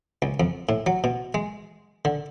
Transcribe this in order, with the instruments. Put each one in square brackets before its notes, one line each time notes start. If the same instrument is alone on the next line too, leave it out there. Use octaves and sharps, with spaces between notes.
[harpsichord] C#2
F2
A2
F#3
B2
G#3
D3